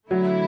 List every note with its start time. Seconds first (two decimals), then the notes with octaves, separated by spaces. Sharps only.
0.10 D3 F#3 A3 E4